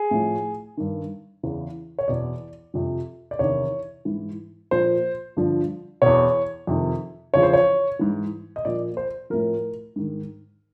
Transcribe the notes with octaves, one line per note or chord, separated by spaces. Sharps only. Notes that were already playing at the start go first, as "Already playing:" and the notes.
Already playing: G#4
A2 F3
G2 D#3
E2 C#3 E3
C#5
E2 B2 D5
F2 C3 F3
D5
E2 C3 D#3 C#5
G#2 E3
A#2 F3 C5
G2 D3 F3
E2 B2 C#5
F2 C3 D#3
E2 C#3 F3 C#5
C5
C#5
G#2 E3
D#5
A#2 F3 D5
C5
A2 F3 A#4
G#2 D#3